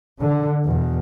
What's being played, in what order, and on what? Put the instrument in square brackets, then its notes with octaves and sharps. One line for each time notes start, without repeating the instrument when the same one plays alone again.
[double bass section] D3
E2 B2